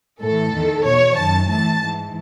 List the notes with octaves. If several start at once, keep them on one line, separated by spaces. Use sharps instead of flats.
A2 E3 A4
E2 D#3
E2 B2 C#5
F#2 D#3 A5
A2 E3 A5
G#2 E3